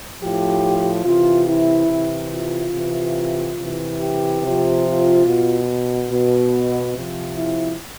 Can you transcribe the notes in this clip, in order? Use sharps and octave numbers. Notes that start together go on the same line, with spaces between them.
A2 F3 G4
C3 E3 F4
E4
C3 E3
F4
C3 E3
C3 E3
G4
C3 F3
F4
B2
B2
C3 F3
E4